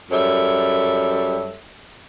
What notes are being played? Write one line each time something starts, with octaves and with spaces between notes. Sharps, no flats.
F#2 G3 A4 C#5 E5